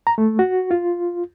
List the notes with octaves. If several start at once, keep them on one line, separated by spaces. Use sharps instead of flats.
A#5
A3
F#4
F4